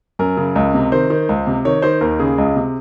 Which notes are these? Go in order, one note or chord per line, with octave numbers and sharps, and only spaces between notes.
F#2 A#4
C#3
C#2
C3
D#3 C5
D#3
C#2
C3
D#3 C#5
D#3 C5
D#2 A#4
C#3 G#4
C#2
C3